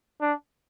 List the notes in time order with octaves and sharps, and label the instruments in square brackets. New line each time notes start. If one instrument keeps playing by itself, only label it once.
[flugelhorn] D4